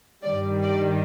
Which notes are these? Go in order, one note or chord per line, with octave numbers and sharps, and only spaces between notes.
G2 D#3 G3 D5
D5